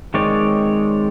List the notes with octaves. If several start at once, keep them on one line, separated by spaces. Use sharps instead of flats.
D#3 G#3 C4 C#5 D5